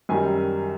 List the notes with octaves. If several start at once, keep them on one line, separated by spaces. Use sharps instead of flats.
F#2 D#3 G3 G#5